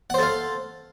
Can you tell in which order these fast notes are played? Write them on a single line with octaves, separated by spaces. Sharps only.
F#5 C5 A4 F5